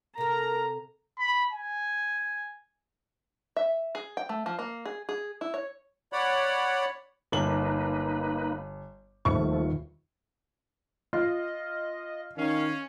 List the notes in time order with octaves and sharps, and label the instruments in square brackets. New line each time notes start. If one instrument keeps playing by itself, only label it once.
[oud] C3 A4 [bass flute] A#4 [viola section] A#5
[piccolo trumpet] B5
G#5
[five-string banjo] E5
G#4
G5
A3
F3
A#3
G#4
G#4
E4
C#5
[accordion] C#5 D5 F#5 B5
[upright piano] G1 F#7 [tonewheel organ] A#3 D#4 B4
[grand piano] D#1 [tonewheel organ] F3 A3 [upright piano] C#6
[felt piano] F4 [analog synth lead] D#5
[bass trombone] D#3 [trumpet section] C#4 [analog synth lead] F5